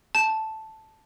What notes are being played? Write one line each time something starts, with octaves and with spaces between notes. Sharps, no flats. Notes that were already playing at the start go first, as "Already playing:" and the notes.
A5